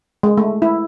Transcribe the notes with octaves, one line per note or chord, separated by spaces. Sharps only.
G#3
A3
E4